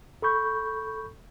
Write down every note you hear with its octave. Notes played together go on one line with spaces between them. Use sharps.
A4 B5 C#6 G6